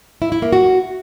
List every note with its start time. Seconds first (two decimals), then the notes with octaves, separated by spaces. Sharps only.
0.22 E4
0.32 E4
0.42 A#3
0.53 F#4